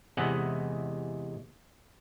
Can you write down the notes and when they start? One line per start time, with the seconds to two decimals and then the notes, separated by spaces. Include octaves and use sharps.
0.17 E2 C3 G#3 E4 D#5 F#5